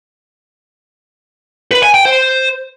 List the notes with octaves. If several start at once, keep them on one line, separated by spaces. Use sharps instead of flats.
B4
G#5
G5
C5